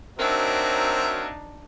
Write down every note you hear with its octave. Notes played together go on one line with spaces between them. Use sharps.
F#3 C4 D4 D#4 A#4 E5